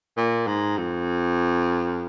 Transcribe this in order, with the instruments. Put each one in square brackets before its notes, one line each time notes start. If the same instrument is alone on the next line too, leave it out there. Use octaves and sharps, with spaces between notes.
[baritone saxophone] A#2
G#2
F2